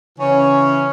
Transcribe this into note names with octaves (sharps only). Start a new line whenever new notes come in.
C#3 E3 C#4